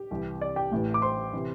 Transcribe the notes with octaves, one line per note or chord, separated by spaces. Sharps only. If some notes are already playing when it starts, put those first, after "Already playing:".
Already playing: G4
C2 C3 E3
D5
G4 G5
A1 A2 E3
D6
C5 C6
C3 E3